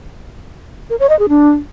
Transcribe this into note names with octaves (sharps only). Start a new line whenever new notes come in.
A#4
C#5
D#5
G#4
D4